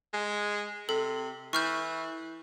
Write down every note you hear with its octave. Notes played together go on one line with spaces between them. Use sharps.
G#3
C3 A4
E3 C#6 F6 G6